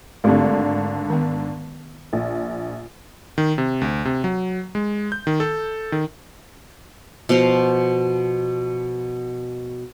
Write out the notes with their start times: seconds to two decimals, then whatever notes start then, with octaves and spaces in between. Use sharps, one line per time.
0.24 G#1 D3 A3 C4 G4
1.10 D#3 B3
2.13 A#1
3.38 D#3
3.58 C3
3.81 D2
4.05 C3
4.24 F#3
4.75 G#3
5.12 G6
5.27 D#3
5.40 A4
5.92 D#3
7.29 B2 F3 F#4 F5